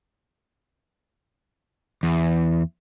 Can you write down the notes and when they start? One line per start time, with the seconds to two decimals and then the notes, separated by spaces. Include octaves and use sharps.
2.03 E2